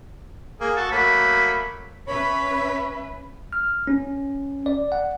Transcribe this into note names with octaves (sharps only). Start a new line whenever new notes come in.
A#3 G#4
F#4 A4
F#3 A3 A#3 B5
C#4 B4 C#5 E5 B5
F6
C#4
D5
F#5